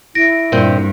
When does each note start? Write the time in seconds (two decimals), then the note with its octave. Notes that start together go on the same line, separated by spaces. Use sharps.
0.15 E4 A#6 D7
0.52 G2 A#2 C4 G5